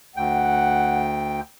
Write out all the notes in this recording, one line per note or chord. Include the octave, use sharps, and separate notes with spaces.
D2 F#5 G5